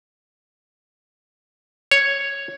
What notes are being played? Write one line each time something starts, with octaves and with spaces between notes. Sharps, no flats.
C#5